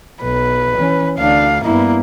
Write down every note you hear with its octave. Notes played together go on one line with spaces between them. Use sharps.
B1 B4
E3 C#4
D2 D4 F5
G2 A#3 B3 E4